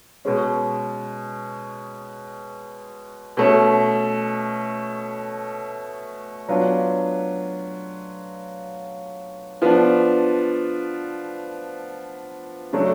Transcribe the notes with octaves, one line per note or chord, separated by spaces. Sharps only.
B2 G#3 C#4
B2 A3 C#4
F#3 B3 D4 F4
F3 B3 D4
C#3 F#3 A3 D4